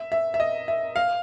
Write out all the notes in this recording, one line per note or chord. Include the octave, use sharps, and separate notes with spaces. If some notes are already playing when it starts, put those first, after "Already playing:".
Already playing: E5
E5
E5
D#5
E5
F5